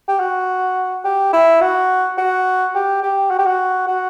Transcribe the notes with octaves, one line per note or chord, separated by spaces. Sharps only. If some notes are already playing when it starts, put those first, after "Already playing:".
G4
F#4
G4
E4
F#4
F#4
G4
G4
F#4
G4
F#4
F#4